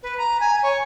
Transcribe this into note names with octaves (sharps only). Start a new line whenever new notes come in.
B4
A#5
G#5
C#5